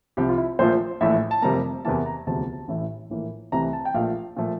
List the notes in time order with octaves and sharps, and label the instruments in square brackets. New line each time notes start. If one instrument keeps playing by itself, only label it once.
[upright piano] C2 C3 F3 G4
F4
E4
A#1 A#2 F3 A3 C5
A#1 A2 E3 A3 E5
A5
F1 F2 C3 G3 A#3 A#5
E2 C3 E3 A#3 A5
A#5
E1 D2 C3 F3 A5
A1 A2 E3 A3
A#1 A2 E3 A#3
C2 C3 E3 A3 A#5
A5
G5
A#1 A#2 A3 F5
A#2 F3 A3